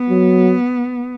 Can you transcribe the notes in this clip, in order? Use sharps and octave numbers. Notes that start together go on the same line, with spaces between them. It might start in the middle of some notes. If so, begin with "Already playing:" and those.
Already playing: B3
F#3